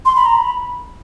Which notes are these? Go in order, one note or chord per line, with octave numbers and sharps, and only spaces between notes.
C6
B5
A#5
B5